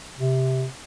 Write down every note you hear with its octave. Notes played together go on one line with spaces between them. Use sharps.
C3